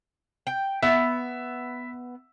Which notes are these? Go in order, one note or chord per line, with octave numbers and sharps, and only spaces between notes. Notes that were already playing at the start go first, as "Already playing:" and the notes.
G5
B3 E5